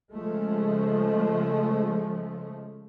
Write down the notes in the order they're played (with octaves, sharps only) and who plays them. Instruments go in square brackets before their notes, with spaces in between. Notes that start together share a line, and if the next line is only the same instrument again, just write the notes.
[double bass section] C#3 F3 G#3 A3